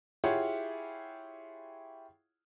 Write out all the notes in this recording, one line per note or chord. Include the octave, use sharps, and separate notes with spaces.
E4 F4 G4 G#4 C#5 F#5